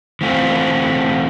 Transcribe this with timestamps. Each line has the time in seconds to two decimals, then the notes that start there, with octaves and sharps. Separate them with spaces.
0.21 E3 A3 C4 F4